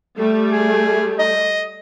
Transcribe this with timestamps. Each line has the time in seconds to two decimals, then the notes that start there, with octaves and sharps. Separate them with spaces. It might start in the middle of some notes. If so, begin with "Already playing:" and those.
0.19 G3 A3
0.51 G#4
1.19 D#5